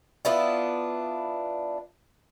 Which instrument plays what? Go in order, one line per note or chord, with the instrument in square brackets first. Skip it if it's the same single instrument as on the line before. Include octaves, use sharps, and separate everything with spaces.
[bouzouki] B3 D4 E4 F4